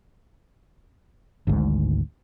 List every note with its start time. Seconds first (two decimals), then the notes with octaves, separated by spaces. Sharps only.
1.47 G#1 D2 G#2